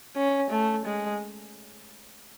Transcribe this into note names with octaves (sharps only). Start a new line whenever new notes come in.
C#4
A3
G#3